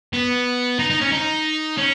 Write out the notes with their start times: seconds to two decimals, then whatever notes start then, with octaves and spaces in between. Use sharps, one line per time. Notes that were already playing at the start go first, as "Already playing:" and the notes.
0.13 B3
0.79 D#4
0.90 D#4
1.01 C#4
1.12 D#4
1.78 C#4